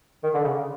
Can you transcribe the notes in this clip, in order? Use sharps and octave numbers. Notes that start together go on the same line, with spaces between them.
D#3
D3
C#3